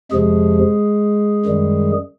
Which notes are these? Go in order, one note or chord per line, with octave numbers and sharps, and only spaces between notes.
F2 C3 F3 G#3 G#4
F#2 D#3 G3